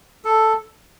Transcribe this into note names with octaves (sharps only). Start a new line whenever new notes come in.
A4